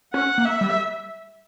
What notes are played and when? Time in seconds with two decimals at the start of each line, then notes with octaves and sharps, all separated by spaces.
0.14 C#4 F#5
0.38 A#3
0.45 E5
0.61 G3